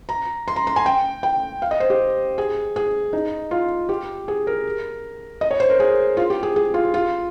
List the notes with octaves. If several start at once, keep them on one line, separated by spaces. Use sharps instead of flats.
A#5
C6
A#5
C6
G#5
G5
G5
F5
D#5
C5
G4
G#4
G#4
D#4
F4
G4
G#4
A#4
D#5
C#5
C5
A#4
G#4
F4
G4
G#4
G#4
F4
F4